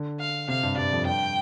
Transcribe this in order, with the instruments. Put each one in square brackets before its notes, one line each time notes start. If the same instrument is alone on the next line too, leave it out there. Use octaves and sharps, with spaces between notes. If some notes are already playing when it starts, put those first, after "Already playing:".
Already playing: [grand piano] D3
[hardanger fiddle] F5
[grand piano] C3 [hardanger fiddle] F5
[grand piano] G2
[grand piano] G2 [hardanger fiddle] D5
[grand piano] F2
[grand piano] G2 [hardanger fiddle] G5